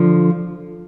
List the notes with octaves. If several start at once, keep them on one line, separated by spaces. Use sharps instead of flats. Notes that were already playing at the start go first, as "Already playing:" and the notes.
Already playing: D3 F3